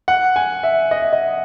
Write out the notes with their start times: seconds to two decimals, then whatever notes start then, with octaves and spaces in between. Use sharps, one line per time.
0.08 F#5
0.36 G#5
0.63 E5
0.91 D#5
1.02 E5
1.13 D#5